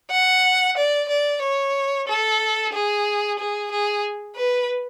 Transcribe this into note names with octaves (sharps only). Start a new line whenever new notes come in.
F#5
D5
D5
C#5
A4
G#4
G#4
G#4
B4